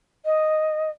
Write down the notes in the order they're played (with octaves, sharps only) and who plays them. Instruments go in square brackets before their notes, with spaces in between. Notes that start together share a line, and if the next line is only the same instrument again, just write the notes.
[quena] D#5